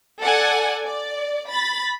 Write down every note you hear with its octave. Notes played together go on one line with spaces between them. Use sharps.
A4 D5 F#5 G#5
D5
B5 A6